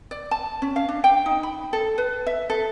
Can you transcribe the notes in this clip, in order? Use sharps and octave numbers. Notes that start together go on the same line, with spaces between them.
D5
A5
C#4
F5
D4
G5
D#4
B5
A4
B4
E5
A4